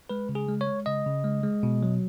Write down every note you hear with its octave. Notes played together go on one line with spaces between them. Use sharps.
G#3 B4
C#3
G#4
G#3
C#5
G#3
C#3 D#5
C#3
G#3
G#3
B2
F#3